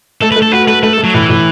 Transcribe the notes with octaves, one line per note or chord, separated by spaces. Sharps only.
A3 A4
B4
A3
A4
F#4 B4
A3 B4
A3 B4
A4
A3
F#3
A2 E3
A2